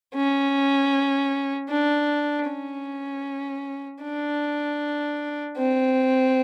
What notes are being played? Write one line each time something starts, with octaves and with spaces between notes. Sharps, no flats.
C#4
D4
C#4
D4
C4